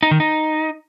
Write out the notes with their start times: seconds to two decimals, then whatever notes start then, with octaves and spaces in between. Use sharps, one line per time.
0.03 D#4
0.11 D#3
0.20 D#4